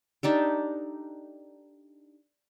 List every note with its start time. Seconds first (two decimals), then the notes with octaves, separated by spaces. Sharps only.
0.23 D4 D#4 G4 A4